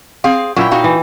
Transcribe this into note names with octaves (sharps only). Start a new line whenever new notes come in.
C4 G#4 F5
A#2 F#3 C#4 E4 G5
D#4 F#4 F5
E3